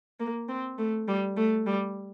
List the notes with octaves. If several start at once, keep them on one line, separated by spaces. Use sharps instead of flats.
A#3
C4
A3
G3
A3
G3